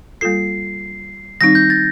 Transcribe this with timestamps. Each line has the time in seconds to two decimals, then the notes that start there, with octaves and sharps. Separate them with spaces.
0.21 G3 A#3 F4 A4 C7
1.41 D#3 G3 C4 D#4 A#6
1.55 G6
1.70 A6